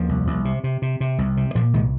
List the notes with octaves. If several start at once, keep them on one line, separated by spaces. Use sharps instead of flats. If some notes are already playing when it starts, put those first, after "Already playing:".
Already playing: D#2 F3 A#3
C2
C2
C3
C3
C3
C3
C2
C3
A#2 F3 A#3
C2 D#3 G#3